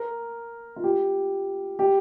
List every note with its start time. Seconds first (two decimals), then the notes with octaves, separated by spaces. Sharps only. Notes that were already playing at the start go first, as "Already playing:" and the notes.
Already playing: A#4
0.76 F4
0.84 G4
1.79 G4